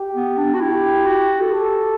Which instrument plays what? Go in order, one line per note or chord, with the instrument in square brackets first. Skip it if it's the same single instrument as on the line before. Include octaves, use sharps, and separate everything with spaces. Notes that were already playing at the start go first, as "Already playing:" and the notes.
Already playing: [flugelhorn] G4
[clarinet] B3
D4
F#4
[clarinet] E4 [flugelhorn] G4
[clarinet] F#4
A4
[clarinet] G4 [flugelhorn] A4